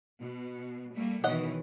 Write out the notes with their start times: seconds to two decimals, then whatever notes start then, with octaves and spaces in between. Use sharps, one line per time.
0.19 B2
0.93 G3 A3 A#3
1.24 B2 D#3 E3 C#5 D#5 F#5